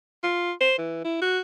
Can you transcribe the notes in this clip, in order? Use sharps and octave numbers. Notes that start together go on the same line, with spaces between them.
F4
C5
E3
E4
F#4